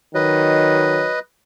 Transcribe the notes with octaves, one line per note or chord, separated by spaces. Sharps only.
D#3 F#3 B4 D#5